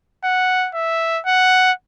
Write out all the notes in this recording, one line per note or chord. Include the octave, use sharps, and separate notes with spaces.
F#5
E5
F#5